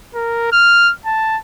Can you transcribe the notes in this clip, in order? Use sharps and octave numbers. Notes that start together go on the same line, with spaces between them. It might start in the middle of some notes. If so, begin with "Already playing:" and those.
A#4
F6
A5